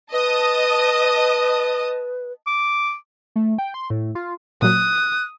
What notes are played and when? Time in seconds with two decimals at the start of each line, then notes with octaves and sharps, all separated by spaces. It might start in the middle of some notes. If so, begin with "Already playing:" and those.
0.12 B4 D#5 A5 D#6
2.47 D6
3.36 A3
3.58 G5
3.74 C6
3.90 A2
4.15 F4
4.62 A#2 F#3 D#6 F#6